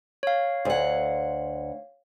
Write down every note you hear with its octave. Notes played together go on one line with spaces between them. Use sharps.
C#5 F5
D2 F#5